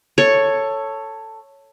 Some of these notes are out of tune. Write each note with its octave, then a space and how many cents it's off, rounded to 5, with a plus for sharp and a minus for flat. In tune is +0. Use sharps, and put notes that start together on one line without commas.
A4 +10 C#5 +0